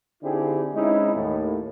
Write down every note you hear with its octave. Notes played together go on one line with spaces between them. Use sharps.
D3 C4 D#4 E4 G4 G#4
G#3 C4 C#4 D#4 E4
D#2 A2 A#3